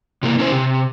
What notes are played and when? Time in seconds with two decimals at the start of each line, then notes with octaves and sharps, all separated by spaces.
0.23 C3 E3 A#3
0.39 C#4 E4 C5
0.52 C3